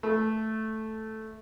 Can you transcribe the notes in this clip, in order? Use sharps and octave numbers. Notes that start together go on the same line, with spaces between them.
A3